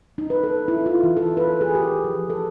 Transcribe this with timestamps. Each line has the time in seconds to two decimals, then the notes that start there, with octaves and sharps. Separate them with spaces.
0.18 D#4
0.30 B4
0.44 A4
0.68 E4
0.86 F4
1.03 E3
1.17 A4
1.37 B4
1.61 G#4
1.75 G4
2.04 F3
2.30 A4